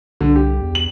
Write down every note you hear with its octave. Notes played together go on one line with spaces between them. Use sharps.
C2 D3
G4
E2
F#7